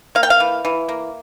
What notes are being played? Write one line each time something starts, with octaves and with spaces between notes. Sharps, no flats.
A#3 F5
G5
F5
E3
E3
A#3